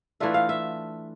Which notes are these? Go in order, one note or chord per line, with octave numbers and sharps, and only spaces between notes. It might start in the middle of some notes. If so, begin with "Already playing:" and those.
E3 A3 D4 F4 E5
F5
E5